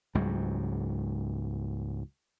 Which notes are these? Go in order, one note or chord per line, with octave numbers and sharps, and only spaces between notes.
C#2 G#2 F#3 G3